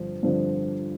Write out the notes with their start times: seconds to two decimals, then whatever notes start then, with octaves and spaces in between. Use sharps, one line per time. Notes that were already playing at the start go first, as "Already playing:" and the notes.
Already playing: G2 D3 F3 C4
0.23 G2 D3 F3 C4